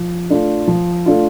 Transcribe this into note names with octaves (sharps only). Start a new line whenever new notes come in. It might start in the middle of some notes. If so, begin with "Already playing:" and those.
Already playing: F3
A3 D4 F4
F3
A3 D4 F4